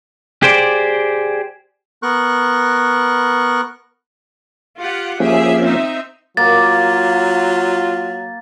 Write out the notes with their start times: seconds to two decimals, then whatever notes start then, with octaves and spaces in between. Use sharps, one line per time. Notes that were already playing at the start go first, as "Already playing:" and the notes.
0.42 G4 G#4 C5 D5
2.03 B3 A#4 C#6 F#6
4.80 F4 G4 F#5
5.20 F3 A#3 C#4 G4 G#4 E5
5.61 C4 D#4 E5
6.37 F#3 A#3 F4 A6